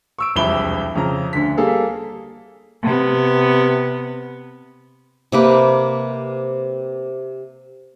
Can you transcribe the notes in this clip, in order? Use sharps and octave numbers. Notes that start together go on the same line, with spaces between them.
C#6 E6 D7
E1 C2 F2 E5 B5 G7
F2 C#3 A#5
D2 D3 B6
G3 A#3 G#4 A4 F5
C3 B3
C3 A#3 B4